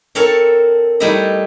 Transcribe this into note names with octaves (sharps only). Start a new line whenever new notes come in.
C4 A4 A#4 C#5 A5
G3 A3 D#4 E4 D#5